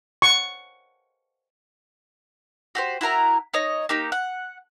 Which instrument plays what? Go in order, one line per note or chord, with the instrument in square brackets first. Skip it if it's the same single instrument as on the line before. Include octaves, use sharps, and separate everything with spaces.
[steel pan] C#6
[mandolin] F#4 G4 C5
E4 F#4 A#4 A#5
D#4 C#5 D#5
A#3 D#4 G4
F#5